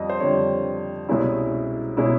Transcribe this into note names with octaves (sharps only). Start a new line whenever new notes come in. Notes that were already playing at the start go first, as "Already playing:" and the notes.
Already playing: F2 G3 D#5
C5
F2 D3 G3 C#5
C2 B2 G#3 C#4 E4
B2 G#3 C#4 E4